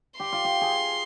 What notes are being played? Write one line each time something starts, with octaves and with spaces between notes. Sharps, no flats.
G4 C6
F4
G4
G#4